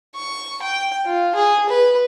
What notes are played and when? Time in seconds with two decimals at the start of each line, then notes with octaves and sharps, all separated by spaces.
0.15 C#6
0.62 G5
1.05 F4
1.35 G#4
1.69 B4